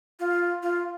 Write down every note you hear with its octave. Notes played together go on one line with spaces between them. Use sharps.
F4
F4